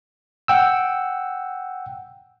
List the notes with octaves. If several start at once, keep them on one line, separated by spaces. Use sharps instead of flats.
F#5 G5 E6